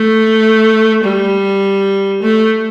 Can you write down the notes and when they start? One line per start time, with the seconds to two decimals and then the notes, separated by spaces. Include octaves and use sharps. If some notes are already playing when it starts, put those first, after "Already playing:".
Already playing: A3
1.05 G3
2.23 A3